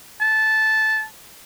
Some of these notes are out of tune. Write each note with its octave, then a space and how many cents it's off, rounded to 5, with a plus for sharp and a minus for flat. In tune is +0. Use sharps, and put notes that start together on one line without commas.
A5 -10